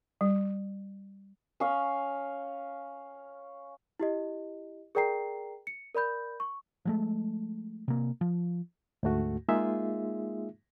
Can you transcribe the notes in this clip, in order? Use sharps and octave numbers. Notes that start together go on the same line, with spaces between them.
G3
C#4 F5
E4 G4 D#5
G#4 A#4 D5 G5 A#5 C7
C#7
A#4 D5 B5 G6
C#6
F3 G#3 A3
C3 A#3
F3
D2 G#2 A3 F#4
G#3 A#3 D#4 F4 G#4 E5